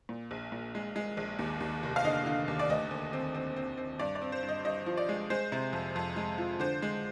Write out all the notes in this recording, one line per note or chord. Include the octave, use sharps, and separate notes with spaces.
A#2
A#1
A#2
G#3
G#3
A#1
D#2
D#2
F1
F5
D3 D#5
D3
D#2
D5
D2 D#5
D2
C4
C4
C4
C4
G2 D5
D5
C4
C5
G2
D#5
G2 D#5
F3
D5
G#3
G#3 C5
C3
F2
F2
G#3
F3
D3 C5
G#3